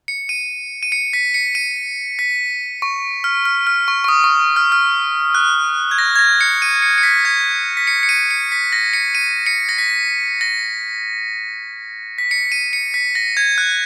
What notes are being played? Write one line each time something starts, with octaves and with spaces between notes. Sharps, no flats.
C#7
D#7
D#7
C#7
B6
C#7
D#7
B6
C#6
F6
F6
F6
C#6
C#6
D#6
C#6
F6
F6
F#6
G#6
A#6
G#6
A#6
C#7
D#7
C#7
C#7
B6
G#6
B6
C#7
C#7
D#7
C#7
B6
A#6
C#7
D#7
C#7
A#6
B6
A#6
B6
C#7
D#7
C#7
B6
A#6
G#6
F#6